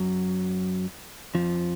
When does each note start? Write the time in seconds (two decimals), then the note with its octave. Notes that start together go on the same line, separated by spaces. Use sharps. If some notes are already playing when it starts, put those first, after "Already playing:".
Already playing: F#2 F#3
1.35 F2 F3